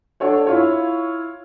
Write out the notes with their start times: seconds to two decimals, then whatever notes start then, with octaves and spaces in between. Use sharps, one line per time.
0.20 D4 A4 C#5 F#5
0.47 E4 F4 C#5